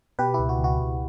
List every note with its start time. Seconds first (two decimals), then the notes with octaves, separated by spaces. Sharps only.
0.19 B2 G4 B4
0.34 C#2 E4 G4
0.49 F#4
0.59 C#2
0.64 F#4
0.79 C#2